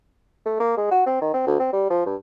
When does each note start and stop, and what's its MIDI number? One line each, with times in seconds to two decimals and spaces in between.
0.46 0.58 57
0.60 0.75 58
0.77 0.88 56
0.91 1.02 66
1.06 1.20 60
1.22 1.33 51
1.34 1.46 60
1.47 1.56 38
1.60 1.68 60
1.73 1.87 55
1.90 2.05 53
2.06 2.16 43